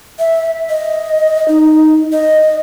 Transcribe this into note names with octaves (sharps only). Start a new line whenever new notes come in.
E5
D#5
D#4
D#5